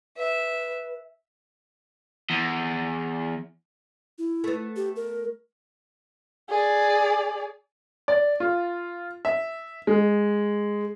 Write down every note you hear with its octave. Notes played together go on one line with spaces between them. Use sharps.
B4 E5
E2
E4
A3 B3
G4
A#4
G#4 D5
D5
F4
E5
G#3